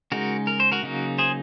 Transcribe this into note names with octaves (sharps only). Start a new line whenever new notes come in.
C#3 G#3 D#4 F#4 A#4
A#4
C5
F#4 A#4
C#3 F#3 A#3 D#4
G#4 C5